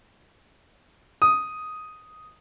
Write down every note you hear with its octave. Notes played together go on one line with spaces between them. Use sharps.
D#6